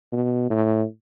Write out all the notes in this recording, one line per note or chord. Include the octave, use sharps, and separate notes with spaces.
B2
A2